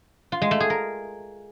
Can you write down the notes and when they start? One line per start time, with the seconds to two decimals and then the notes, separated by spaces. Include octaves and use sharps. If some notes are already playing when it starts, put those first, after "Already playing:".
0.32 F4
0.42 G#3
0.51 A3
0.60 G#4
0.70 A#4